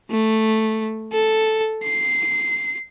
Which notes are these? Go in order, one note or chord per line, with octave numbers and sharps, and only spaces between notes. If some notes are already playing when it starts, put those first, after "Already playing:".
A3
A4
C7